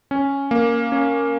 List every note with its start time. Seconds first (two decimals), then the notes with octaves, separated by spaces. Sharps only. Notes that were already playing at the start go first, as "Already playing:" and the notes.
0.11 C#4
0.51 A#3
0.92 C#4